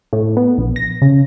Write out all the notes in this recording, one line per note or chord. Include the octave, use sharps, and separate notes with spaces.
A2
B3
A#1
A#6
C#3